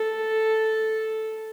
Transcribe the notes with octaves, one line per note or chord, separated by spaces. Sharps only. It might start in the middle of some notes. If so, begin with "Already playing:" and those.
Already playing: A4